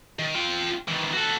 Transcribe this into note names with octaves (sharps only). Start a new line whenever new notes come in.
D#3
F4 G5
D#3 E3
F#4 A4